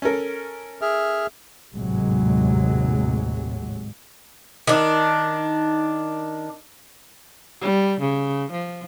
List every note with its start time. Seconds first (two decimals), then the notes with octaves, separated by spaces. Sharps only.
0.02 C#4 A4 A#4
0.82 G#4 E5 F6
1.75 G#1 D#2 A2 C3 F#3 G#3
4.67 D#3 D4
7.61 G3
8.00 C#3
8.52 F3